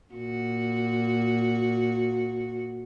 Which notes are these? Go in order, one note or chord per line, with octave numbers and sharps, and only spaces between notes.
A#2 F#4